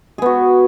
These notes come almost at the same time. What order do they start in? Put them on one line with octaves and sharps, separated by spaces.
G#4 B3 F#4